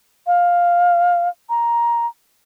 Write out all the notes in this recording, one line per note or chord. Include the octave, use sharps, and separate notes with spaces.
F5
A#5